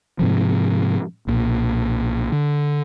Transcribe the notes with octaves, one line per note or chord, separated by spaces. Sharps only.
G#2 C3 F3
B1 A#2
D3